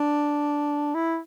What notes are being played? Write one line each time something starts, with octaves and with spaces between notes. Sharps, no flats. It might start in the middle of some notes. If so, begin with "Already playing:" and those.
Already playing: D4
E4